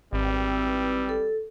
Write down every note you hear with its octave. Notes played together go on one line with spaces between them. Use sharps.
G#1 E3 G3 C4
A4